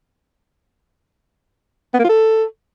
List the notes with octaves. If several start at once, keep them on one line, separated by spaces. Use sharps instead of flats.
B3
A#3
F4
A4